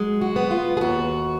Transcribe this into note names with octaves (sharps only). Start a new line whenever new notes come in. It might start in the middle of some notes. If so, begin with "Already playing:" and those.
Already playing: F#3 G#3
F#4
B3
F4
G#4
D#2 F#4